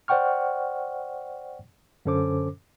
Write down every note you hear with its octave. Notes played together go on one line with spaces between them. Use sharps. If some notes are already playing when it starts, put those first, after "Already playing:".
C5 D5 F#5 G5 C#6 F6
F#2 D3 C#4 A4 C5 D6